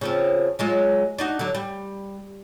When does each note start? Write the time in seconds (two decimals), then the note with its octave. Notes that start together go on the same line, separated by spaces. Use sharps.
0.01 C#3 F3 C4
0.59 F#3 G#3 F4
1.19 D4 D#4 F#4
1.39 D3 F#3
1.55 G3